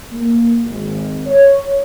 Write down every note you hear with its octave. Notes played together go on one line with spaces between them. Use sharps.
A#3
G#1
C#5